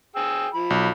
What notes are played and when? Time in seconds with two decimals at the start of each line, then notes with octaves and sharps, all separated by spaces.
0.16 G#4 G5 E6
0.54 F3 B5
0.70 B1